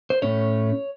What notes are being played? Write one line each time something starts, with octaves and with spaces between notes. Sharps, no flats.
C5
A2 A3 C#4 C#5